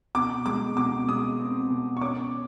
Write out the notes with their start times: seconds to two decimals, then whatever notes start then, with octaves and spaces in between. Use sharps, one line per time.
0.15 B2 D6
0.46 G#3 D6
0.77 B2 D6
1.08 G#3 D#6
1.40 C4
1.70 B2
1.97 C#6
2.01 C#4 D6